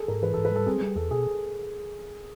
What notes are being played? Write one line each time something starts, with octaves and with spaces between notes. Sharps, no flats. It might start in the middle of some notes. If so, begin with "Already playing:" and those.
Already playing: G#4 A4
G#2 A#4
E3 B4
G#2 A4
B4
G3 A4
C4 G#4
G3
E2 A4
B2 G#4